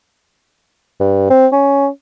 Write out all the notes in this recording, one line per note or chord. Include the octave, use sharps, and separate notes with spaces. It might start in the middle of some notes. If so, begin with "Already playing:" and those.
G2
C4
C#4